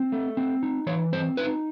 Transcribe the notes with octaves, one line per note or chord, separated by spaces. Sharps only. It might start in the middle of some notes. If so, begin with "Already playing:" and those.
Already playing: C4
A3
C4
D#4
E3 C#5
C4 C5
D#4 B4